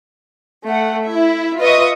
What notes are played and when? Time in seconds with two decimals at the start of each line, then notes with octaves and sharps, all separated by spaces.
0.67 A3 F#5
1.08 E4 E5
1.59 F4 B4 D#5 E5 C#6 D#6